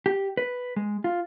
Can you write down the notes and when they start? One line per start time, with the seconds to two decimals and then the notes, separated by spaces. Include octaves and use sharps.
0.06 G4
0.37 B4
0.76 G#3
1.04 F4